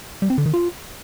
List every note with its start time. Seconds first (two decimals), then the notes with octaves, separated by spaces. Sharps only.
0.22 G3
0.30 C4
0.38 D3
0.46 D#3
0.54 F4